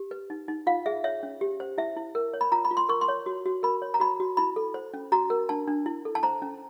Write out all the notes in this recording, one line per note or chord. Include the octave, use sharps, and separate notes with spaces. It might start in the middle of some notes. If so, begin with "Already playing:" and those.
Already playing: G4
B4
D#4
D#4
F4 F5
G#4 E5
C#5 E5
C#4
G4
C5
E4 E5
E4
A#4
C#5
B5
F4 A#5
B5
F4
C6
A#4 C#6
C6
C#5
F#4
F#4
A#4 B5
C#5
A#5
F#4 B5
F#4
E4 B5
A4
C5
C#4
F#4 A#5
A#4
D4 A5
D4
E4
A4
A5
C5 A#5
C#4